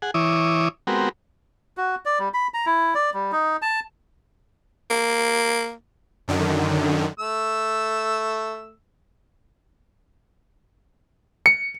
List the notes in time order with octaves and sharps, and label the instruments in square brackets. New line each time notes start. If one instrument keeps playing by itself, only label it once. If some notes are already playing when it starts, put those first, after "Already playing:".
[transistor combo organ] G#4 F#5
E3 E4 C#5 D6 D#6
G#3 B3 C4 F#4 G4 A#4
[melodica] F#4
D5
G3
B5
A#5
E4
D5
G3
D#4
A5
[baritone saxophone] A#3
[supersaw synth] F#2 D3 D#3
[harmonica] A3 E6
[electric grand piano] C#7